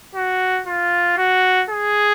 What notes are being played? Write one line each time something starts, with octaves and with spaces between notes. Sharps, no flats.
F#4
F4
F#4
G#4